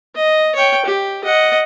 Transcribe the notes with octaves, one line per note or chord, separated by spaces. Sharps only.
D#5
C#5 G5
G4
D#5 F#5